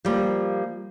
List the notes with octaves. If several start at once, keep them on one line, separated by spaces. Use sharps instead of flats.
F3 G3 A#3